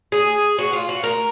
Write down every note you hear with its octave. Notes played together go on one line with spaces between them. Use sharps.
G#4
F#4
F4
F#4
A#4